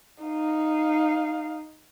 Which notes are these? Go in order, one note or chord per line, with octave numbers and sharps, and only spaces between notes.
D#4 F5